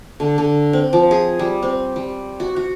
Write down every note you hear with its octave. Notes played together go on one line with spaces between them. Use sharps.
D3
D3
C4
F3
G#4
G3
C4
G3
F#4
F#4